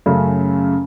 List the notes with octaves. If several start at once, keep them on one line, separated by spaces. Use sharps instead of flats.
F#2 C#3 A3